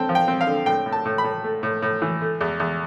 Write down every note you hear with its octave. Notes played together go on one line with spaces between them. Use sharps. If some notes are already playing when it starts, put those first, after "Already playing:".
Already playing: D3 C4 G5 A5
F3
G5
C4
F5
D3
A2 G5
A2
A5
A2
B5
A2
A3
A2
A2
E3
A3
E2
E2